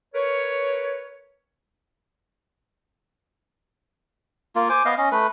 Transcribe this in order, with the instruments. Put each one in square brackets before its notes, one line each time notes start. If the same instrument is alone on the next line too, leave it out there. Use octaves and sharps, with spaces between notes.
[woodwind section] A#4 B4 C#5
[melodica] A#3 F4
C5 G#5 D6
B3 D#5 F5
C#4 D#5
A3 B4